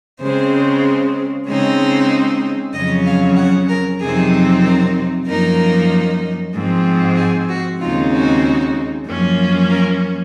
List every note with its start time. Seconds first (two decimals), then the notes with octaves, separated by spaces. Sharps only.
0.20 C#3 G#3 C4 C5
1.47 C#3 G#3 C4 D#4 C#5
2.74 F2 C#3 F#3 C#4 D#5
3.06 F5
3.37 F#5
3.69 A#4
4.00 F2 C3 F#3 C4 D#4 G#4
4.64 A#4
5.27 F#2 F3 A#3 D#4 A#4
6.54 G#2 F3 C4
7.17 G#4
7.49 F#4
7.81 D#2 C#3 G#3 C4 D#4 F4
8.13 F#4
9.07 F#2 F3 A#3 C#4
9.71 A#4